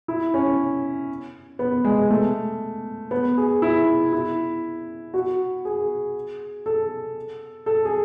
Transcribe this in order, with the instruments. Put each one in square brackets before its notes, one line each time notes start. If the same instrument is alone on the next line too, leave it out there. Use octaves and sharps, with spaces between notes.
[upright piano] E4
C#4
B3
G#3
A3
B3
G#4
E4
E4
F#4
G#4
A4
A4
G#4